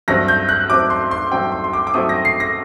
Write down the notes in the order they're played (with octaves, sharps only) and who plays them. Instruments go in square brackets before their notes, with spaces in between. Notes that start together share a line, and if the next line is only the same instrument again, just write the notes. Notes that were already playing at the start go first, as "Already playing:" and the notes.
[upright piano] G2 F#3 A3 C4 A#6
G6
F#6
G2 F#3 A3 C4 D6
C6
C6
G2 F#3 A3 C4 G5
C6
C6
D6
D6
G2 F#3 A3 C4 D#6
A#6
C7
A#6